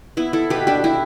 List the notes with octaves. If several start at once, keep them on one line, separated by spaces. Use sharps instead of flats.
B3 E4
E4 A4
B2 G4 B4
D4 G4
D4 E4